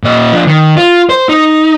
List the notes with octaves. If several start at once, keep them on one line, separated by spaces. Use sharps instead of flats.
A#2 D#5
F3 D4
D#3
F4
C5
D#4